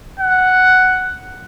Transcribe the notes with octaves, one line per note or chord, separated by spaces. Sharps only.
F#5